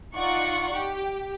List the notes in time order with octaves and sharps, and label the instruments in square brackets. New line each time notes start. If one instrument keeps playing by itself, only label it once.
[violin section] D#4 F4 D5 F#5 C#6
G4